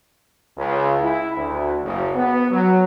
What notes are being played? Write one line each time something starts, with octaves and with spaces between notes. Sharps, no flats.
C#2
E4
D2
F#1
B3
F#3